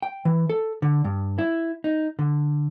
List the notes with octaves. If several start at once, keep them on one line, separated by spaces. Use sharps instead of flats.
G5
E3
A4
D3
G2
E4
D#4
D3